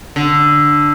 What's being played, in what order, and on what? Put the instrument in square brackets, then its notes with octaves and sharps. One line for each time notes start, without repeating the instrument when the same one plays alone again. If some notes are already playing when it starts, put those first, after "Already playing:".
[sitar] D3